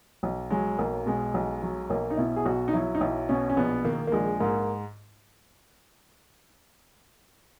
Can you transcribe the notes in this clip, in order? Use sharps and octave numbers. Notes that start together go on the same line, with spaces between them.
B1
F#3 G#3
B1 A#3
B2 G#3
B1
F#3
B1 A#3
D#4
B2 E4
G#4
B1 F#4
D#4
F#3 E4
D#4
B1 E4
B2 C#4
C#4
A#1 B3
D#3 A#3
A#3
A#1 G#3
G#2 A#3